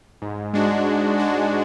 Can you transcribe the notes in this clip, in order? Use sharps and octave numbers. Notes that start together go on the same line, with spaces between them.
G#2
G#3 D4 F#4
G#2
G#3 D4 F#4